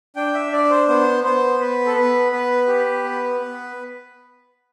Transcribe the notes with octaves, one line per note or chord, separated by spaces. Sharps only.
D4 G5
E5
D4 D5
C5
B3 C5
B3 C5
B3 B4
A4
B3 B4
B3 B4
G4
B3
B3